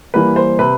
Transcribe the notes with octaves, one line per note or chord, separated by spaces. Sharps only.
E3 G3 A#3 B4
C5
C3 B4